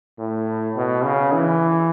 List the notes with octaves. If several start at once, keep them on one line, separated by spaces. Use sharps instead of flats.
A2
B2
C#3
E3